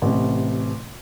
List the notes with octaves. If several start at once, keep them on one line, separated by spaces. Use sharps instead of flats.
A1 C3